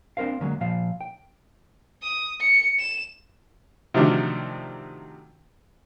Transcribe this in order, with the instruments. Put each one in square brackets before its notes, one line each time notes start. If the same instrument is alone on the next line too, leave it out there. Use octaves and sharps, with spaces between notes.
[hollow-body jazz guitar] C4 D4 A#4 C5 F5
D3 F#3 G#3 A#3
A#2 F3 F5
G5
[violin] D#6
C#7
E7
[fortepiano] C3 D#3 F3 F#3 A3 D4